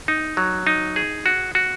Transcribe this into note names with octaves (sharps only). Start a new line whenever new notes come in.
D#4
F#3
D#4
G#4
F#4
F#4